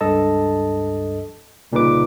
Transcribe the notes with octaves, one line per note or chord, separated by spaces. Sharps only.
C#2 G2 A4 D#5 A5
C2 A#2 C#3 D#4 B4 D6